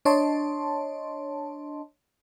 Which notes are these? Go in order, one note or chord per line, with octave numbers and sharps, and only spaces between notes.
D4 C#5 D#5 A5 C6